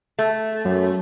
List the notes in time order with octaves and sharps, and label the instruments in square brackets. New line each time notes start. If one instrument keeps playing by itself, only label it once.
[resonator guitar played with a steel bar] A3
[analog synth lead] F#2